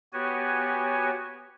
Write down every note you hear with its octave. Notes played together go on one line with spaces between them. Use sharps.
B3 F#4 G4 C#5 G#5